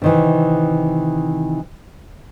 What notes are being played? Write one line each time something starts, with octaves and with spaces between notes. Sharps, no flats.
C3 D#3 E3